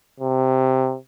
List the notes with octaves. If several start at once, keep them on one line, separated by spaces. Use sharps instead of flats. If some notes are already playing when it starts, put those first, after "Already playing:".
C3